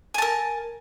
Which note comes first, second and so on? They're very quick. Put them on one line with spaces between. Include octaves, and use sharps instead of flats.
G#5 A5 A#4